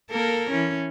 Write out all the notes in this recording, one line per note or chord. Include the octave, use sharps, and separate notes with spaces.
A#3 A4 A#4
E3 C#4